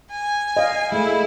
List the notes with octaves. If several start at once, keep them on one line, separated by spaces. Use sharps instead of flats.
G#5
D#5 F5
G#3 A3 E4